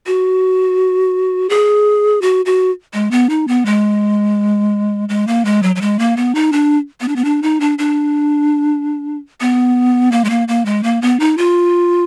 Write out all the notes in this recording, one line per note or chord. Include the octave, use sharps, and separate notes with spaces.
F#4
G#4
F#4
F#4
G#3
B3
D#4
B3
G#3
G#3
A#3
G#3
F#3
F#3
G#3
A#3
B3
D#4
D4
B3
D4
B3
D4
D#4
D4
D4
B3
A#3
G#3
A#3
A#3
G#3
A#3
B3
D#4
F4